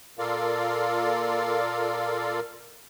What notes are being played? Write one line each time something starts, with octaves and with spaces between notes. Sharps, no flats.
A#2 F4 A4 A#4 D5 F5